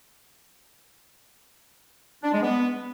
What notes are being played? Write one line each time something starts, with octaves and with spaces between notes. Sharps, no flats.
D4
G#3
B3